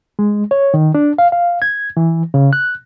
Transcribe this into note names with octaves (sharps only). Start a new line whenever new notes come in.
G#3
C#5
D#3
D4
F5
F5
G#6
E3
C#3
F#6